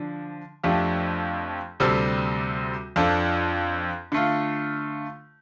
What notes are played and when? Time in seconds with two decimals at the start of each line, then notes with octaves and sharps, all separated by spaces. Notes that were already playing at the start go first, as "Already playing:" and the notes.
Already playing: D3 F3 D4
0.63 F2 F3 A3 D4 G4
1.80 D2 C3 G3 C4 A4
2.96 F2 F3 D4 A4
4.12 D3 A3 F4